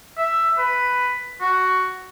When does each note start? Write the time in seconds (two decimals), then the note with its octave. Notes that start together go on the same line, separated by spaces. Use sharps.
0.18 E5
0.58 B4
1.41 F#4